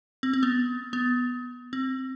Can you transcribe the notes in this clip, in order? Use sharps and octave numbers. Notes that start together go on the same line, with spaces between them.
C4
C4
B3
B3
C4